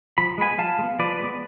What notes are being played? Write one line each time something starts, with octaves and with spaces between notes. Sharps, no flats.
F3 B5
G#3 B3 G#5 B5
F3 F5 A5
G#3
B3
F3 B4 D5
G#3 B3